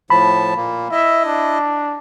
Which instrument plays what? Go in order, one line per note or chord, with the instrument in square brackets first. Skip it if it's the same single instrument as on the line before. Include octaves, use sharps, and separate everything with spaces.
[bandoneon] A2 F3 A5 [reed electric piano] B5
[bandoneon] A#2 A#3
[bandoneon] E4 D#5 [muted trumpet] E5
[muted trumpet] D4